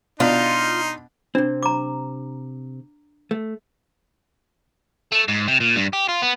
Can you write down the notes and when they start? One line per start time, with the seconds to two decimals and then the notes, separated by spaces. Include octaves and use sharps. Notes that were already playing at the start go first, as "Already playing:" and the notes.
0.20 B2 D4 D#4 F4 C6
1.35 C3 C4 D4
1.63 A#5 D6
3.31 A3
5.12 A3
5.28 G#2
5.48 C3
5.60 A#2
5.76 G2
5.93 G4
6.09 F4
6.22 B3